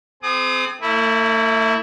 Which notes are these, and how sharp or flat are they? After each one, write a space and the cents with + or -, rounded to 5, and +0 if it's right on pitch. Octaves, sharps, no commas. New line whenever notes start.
C4 -25 G#4 +30 D#6 -40
A3 +45 E4 -10